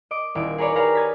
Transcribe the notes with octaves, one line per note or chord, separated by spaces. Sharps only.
D#5 D6 D7
D#1 E4 D7
G#4 A#4 B4 C#5 D5
G4 G#4 B4 C#5 F5 A#5
B4 D#6 G#6 A6 B6